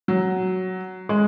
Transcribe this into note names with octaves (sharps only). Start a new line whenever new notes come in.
F#3
G#3